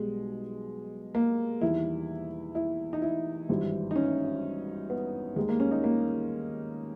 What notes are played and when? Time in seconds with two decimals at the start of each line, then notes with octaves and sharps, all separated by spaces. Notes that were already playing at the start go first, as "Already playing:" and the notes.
Already playing: B1 B2 G3 G#3
1.15 A#3
1.61 E2 D#3 G3 E4
2.55 E4
2.93 D#4
3.02 E4
3.49 G#1 G2 E3 G3
3.91 D#4
3.96 C#4
4.90 B3
5.36 D#2 D#3 G3 G#3
5.49 A#3
5.60 C#4
5.71 D#4
5.84 A#3